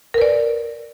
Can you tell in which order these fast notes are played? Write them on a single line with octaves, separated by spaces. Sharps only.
A#4 B4 D5